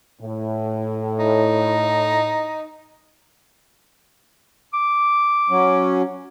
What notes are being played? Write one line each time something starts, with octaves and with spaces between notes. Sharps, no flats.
A2
D#4
D6
F#3 C#4